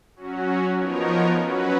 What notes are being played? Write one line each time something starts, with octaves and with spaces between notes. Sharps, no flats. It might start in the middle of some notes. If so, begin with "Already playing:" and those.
F#3 C#4 F#4
F3 B3 D#4 A#4 C#5
F#3 C#4 F#4 B4